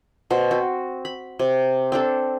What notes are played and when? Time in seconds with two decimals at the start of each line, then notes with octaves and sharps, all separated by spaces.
0.30 B2 C5
0.51 C4 F#4
1.05 B5
1.39 C3
1.92 C4 D4 A4